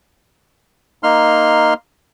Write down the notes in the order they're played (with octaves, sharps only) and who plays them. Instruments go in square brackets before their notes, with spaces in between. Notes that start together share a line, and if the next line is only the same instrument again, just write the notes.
[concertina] A#3 D#4 C6 F6